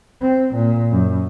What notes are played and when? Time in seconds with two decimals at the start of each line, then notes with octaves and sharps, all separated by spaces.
0.21 C4
0.54 A#2
0.91 F#2